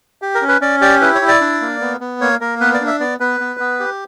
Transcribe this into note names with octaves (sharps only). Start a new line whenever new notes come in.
G4
A#4
C#4
B4
C#4 D5
G4 D5
E4 B4
C#5
E4
D5
D4
A#3
B3
B3
A#3 C#5
A#3 A#4
B3 B4
D5
D4
E5
B3 D5
B3 B4
B3
B3
G4